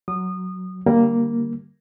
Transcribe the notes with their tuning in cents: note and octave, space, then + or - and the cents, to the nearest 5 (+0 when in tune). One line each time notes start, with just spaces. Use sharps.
F#3 +0 D#6 -25
D3 +0 G3 -10 A#3 +0